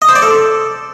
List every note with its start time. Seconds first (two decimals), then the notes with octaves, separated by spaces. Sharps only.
0.02 D#5
0.09 C5
0.15 D5
0.22 A4